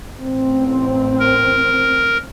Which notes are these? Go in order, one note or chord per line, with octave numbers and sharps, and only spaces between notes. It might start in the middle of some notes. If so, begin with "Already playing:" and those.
A1 C4
A#4